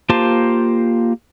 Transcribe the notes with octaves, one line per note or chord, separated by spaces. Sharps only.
A#3 F4 G4 C5 A5